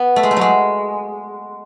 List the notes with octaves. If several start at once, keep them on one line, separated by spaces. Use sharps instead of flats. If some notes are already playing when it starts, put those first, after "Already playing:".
Already playing: B3
A3
G#3
A3
F#3 G#3